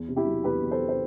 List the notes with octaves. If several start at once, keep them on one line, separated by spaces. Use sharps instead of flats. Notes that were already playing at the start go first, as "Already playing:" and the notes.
Already playing: E2
C3
E4 G4
F#3
E2 G4 B4
E2
A4 C5
C3
C5